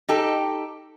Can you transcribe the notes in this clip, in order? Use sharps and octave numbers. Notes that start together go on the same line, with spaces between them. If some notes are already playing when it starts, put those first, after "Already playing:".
D#4 G4 A4